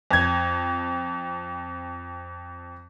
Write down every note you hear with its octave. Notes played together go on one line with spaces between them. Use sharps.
F2 G#6